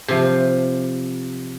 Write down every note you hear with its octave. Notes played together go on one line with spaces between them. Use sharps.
C3 F3